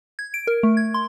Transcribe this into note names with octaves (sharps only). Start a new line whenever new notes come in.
G#6
D7
A#4
A3
G#6
C6